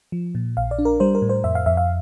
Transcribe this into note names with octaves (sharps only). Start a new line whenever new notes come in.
F3
A#2
A#1 F5
D5
D4
A#4
G3 C5
A#4
A2
C5
F2 E5
F5
F2 E5
F5